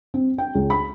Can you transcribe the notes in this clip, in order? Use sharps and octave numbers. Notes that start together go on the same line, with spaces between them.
C4
G5
C#2
B5